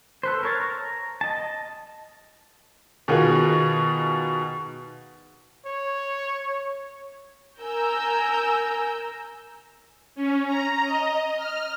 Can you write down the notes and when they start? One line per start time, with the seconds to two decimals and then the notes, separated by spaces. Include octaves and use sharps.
0.23 A4 B4 C5
0.43 A#4 C#5 A5
0.60 A#5
1.21 D#5 A5
3.08 B2 D#3 F4 F#4 G#4
5.66 C#5
7.61 A#4 G#5 A#5 E6 G6
10.15 C#4
10.47 A#5
10.84 D#5
11.36 F6